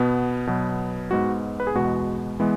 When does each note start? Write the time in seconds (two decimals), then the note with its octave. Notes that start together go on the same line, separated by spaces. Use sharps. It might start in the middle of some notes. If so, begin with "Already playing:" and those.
Already playing: B2 B3
0.47 B2 F#3 B3
1.11 G#2 G#3 B3 F#4
1.60 B4
1.67 G#4
1.75 E2 B2 G#3 B3 F#4
2.40 E3 G#3 B3